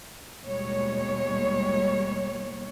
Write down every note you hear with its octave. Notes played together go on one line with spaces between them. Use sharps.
D#2 B2 G3 G#3 C#5